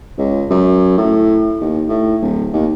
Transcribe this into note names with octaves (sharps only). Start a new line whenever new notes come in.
C#2
F#2
A2
D#2
A2
D1
D#2